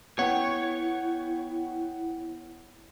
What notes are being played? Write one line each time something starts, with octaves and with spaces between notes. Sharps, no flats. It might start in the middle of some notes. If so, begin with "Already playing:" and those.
B3 E4 C#5 F#5 G5